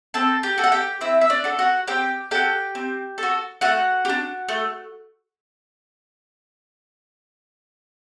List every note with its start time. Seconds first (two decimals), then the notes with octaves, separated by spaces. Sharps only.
0.14 C4 A4 A5
0.43 G4 G5
0.58 F#4 A4
0.64 F#5
0.72 G4 G5
1.01 C4 E4 E5
1.21 E5
1.30 D4 D5
1.44 F#4 A4
1.59 F#4 F#5
1.87 C4 G4 G5
2.31 F#4 G4 A4 G5
2.75 C4
3.18 F#4 A4
3.61 A3 F#4 F#5
4.05 G4
4.09 D4
4.49 A3